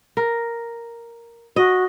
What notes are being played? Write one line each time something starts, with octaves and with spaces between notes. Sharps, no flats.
A#4
F#4 D#5